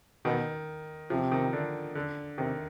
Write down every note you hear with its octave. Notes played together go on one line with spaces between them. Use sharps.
B2 D#3
C3 F3
D#3
D3
D3
C3 D#3